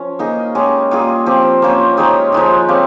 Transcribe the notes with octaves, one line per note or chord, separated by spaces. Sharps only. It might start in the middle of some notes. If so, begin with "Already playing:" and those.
Already playing: F3 C#4
A#3 D#4 G#4 D#5
G#3 C#4 G4
G3 A#3 F4 G#4
F3 C4 G4
A#3 C#4 F4 C5
G#3 D#4 G4 C#5
F3 G#3 D#4
C4 G4 C#5 F5